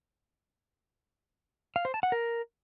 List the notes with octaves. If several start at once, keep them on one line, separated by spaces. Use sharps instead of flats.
F5
C5
A5
F#5
A#4